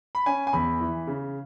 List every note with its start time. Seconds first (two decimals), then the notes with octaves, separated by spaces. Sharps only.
0.15 B5
0.26 C#4 G#5
0.47 G#5
0.53 E2 B5
0.80 E3
1.07 C#3